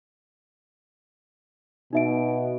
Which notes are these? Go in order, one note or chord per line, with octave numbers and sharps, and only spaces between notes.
B2 D#4 E5 D7